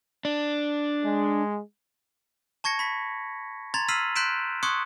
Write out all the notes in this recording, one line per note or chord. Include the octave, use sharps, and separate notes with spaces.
D4
G#3
A5 C#6 G#6 A#6 C#7
B5 B6
A#5 C6 G#6 A6 F7
E6 F6 B6 C7 D#7 F#7
C6 F#6 G6 B6 D7 E7
C6 C#6 D#6 F#6 G#6 C#7